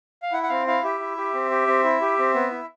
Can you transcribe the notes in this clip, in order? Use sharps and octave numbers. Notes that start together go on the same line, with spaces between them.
F5
E4 F#5
F#5
C4 F5
E4 F5
G4 E5
E4
G4
C4
G4
C4
E4
G4
C4
B3
E4